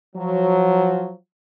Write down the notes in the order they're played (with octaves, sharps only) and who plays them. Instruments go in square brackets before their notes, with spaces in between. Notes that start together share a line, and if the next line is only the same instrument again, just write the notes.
[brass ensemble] F3 F#3